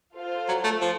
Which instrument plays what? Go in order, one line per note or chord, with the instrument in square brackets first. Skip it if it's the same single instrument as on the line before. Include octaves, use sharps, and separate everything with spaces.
[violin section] F4 A4 C5 F5
[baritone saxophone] F#3
A3
F3